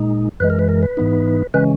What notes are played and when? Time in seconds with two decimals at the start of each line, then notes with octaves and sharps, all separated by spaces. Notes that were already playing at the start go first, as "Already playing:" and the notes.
Already playing: A#2 G#3 D#4
0.40 F#2 E3 G#3 B4
0.50 A#4
0.59 B4
0.69 A#4
0.83 B4
0.97 G#2 E3 B3 D#4
1.54 C#3 E3 G#3 C#4 B4